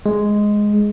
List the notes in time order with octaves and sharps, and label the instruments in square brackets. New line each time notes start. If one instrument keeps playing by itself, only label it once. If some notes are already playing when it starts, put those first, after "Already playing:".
[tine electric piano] G#3